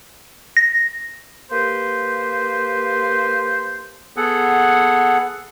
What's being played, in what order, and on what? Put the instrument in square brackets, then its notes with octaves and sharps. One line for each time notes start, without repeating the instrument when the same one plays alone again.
[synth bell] A#6
[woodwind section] A#3 G4 B4 C5
[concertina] B3 G#4 A4 F#5